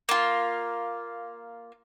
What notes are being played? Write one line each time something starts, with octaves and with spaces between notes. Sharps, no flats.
A#3 F4